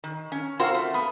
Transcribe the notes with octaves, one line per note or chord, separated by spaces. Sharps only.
D#3
C#4
C4 F4 F#4 A#4 C5
A3
B3